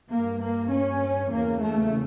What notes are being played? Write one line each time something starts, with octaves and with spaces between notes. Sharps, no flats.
G2 A#3
A#3
C#4
E2 C#3 A#3
A3